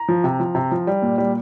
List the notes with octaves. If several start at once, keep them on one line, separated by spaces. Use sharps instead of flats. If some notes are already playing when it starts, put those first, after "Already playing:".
Already playing: A#5
F3
C3
F3
C3
F3
G3
A#2
G3